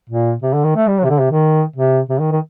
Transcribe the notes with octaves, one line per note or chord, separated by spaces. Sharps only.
A#2
C3
D3
D#3
A3
G3
F#3
C3
D3
C3
D#3
C3
C3
D#3
D#3